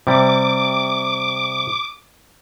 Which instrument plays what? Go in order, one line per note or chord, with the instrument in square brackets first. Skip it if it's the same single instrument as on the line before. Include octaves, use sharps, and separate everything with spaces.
[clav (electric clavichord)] C3 G3 [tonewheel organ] D6